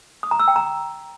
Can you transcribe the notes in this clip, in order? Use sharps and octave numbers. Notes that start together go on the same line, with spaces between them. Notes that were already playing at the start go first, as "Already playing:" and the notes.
D#6
A#5
E6
G5
A#5